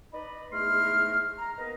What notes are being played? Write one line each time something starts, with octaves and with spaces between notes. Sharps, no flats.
D#4 B4 D5 D#5 B5
E2 G#2 A3 C6 F6
A#5
A#3 B3 B4 D#5